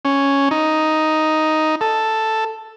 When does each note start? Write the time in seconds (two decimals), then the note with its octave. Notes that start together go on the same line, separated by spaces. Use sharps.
0.05 C#4
0.51 D#4
1.81 A4